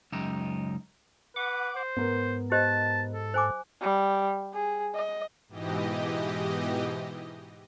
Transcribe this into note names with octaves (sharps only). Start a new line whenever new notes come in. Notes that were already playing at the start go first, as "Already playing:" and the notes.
C#2 F#2 D#4 G4 E5
B4 F#5 D6
C5
G#2 B3 A#4
G4 C5 D#5 A5
A4
C5 G#5 D6
G3
G#4
D#5
G#2 B2 E3 G4 D#5